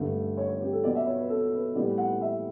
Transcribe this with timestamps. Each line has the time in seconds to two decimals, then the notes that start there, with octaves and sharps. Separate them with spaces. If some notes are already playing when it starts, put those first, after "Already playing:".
Already playing: G2 D3 A3
0.37 C#5
0.49 C#5
0.61 G4
0.72 A4
0.83 B2 F#3 B3 D5
0.95 E5
1.07 C#5
1.18 B4
1.29 A4
1.53 B4
1.75 A2 G3 B3 D5
1.98 F#5
2.21 E5